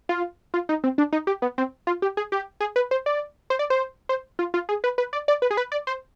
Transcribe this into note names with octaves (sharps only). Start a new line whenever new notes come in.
F4
F4
D#4
C4
D4
D#4
G4
B3
C4
F4
G4
G#4
G4
G#4
B4
C5
D5
C5
D5
C5
C5
F4
F4
G#4
B4
B4
D5
D5
B4
G#4
B4
D5
C5